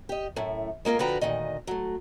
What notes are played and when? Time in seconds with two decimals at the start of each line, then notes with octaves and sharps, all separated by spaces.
0.09 G4 D#5
0.36 F#2 A2 A3
0.85 G#3 A#3 F4 A#4
0.99 D3 F3 F#4 B4 G5 A#5
1.21 D2 A#2 D#3 D#5
1.67 F#3 A3